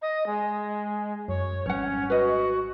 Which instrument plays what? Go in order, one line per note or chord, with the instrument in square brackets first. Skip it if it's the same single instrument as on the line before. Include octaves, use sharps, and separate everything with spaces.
[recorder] D#5
G#3
[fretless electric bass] F#2 [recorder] C#5
[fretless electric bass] G#1 F#3 G3 [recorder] C#4 [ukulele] C#5 F#5
[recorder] F#4 [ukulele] B4 D#5